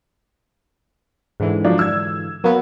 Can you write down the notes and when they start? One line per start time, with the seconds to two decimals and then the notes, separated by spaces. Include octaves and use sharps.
1.40 G#2 D3 E3
1.65 F3 F#3 D4
1.79 E6 G#6
2.44 F#3 A#3 B3